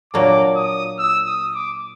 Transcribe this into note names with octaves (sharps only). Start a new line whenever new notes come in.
A#2 F#3 A#3 D4 D6
D#6
E6
D#6
D6